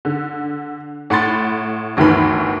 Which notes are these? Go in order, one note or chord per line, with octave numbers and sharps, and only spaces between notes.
D3
A2 F#5 B5 C6 A6
G1 D2 D#3 E3 B5